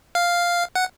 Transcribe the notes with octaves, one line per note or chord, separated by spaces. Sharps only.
F5
F#5